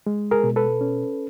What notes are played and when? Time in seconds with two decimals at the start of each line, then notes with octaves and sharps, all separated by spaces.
0.07 G#3
0.31 G#4 A#4
0.44 B2
0.56 A4 B4
0.81 C#4